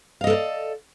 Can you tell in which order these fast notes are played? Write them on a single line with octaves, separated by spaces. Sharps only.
F5 D#5 A4 A#4 D5